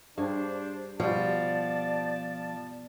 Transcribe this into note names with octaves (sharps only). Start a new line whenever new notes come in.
G2 D4 G#4 C5
B2 F3 G3 D5 A5